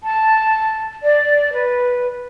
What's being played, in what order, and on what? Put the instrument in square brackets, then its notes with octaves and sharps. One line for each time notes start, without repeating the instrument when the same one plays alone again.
[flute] A5
D5
B4